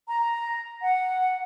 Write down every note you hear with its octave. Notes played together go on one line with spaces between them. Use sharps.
A#5
F#5